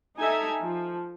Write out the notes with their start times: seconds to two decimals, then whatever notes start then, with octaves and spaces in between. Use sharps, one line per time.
0.18 D#4 G4 A4 E5 G#5 A#5
0.61 F3